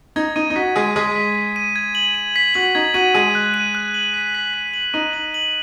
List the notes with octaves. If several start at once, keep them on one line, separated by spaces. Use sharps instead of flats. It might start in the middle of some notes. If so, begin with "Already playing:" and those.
D#4 G#6
D#4 D#7
D#4
F#4 B6
G#3 G#4 D#7
G#3 G#4 B6
B6
B6
D#7
G#6
F#7
D#7
B6
F#4 F#7
D#4 G#6
F#4 D#7
G#3 G#4 D#7
F#6
D#7
F#6
F#7
B6
B6
B6
F#7
D#4 D#7
F#7
F#7